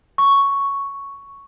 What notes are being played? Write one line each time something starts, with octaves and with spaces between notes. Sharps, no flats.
C#6